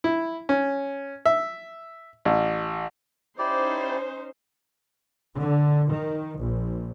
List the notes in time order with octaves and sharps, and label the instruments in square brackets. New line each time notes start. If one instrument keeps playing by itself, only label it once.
[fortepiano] E4
C#4
E5
A1
[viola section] C#4 D#4 C5 [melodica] E4 G4 D5
[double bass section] D3
D#3
A#1